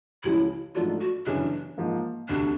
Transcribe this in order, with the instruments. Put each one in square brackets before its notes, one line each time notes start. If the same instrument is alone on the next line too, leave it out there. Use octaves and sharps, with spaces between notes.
[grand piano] C#2 C#3 F3 G#3 C#4 [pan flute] E4
[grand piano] G#2 F3 A3 D4 F#4 [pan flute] F4
[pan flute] F#4
[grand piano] G1 F#2 C#3 E3 [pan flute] D4
[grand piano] G#2 F3 A#3
[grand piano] E1 D2 C3 [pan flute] D4